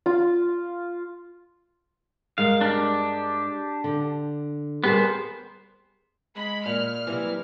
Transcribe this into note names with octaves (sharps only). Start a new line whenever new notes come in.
F4
G2 G#3 A#4 F5
D4 G4
D3
G3 B3 G#4 A#4 C5
G#3 B5
A#2 F6
C3 E3 F#3 G3 A#3 E4